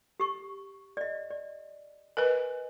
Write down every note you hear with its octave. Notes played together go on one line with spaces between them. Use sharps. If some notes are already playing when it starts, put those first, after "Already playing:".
G4 C#6
D5 D#5
D5
A#4 B4 D#5 G#5